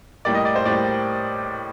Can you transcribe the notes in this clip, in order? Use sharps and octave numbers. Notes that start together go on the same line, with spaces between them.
A2 G3 A#3 D5
D#5
D5
C5
A2 G3 A#3 D5